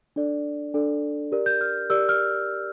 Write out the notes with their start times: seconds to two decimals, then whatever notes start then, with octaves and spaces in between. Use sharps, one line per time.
0.16 D4 A4 D5
0.74 D4 A4 D5
1.32 G4 A#4 D5
1.46 G6
1.61 F6
1.90 G4 A#4 D5 E6
2.09 F6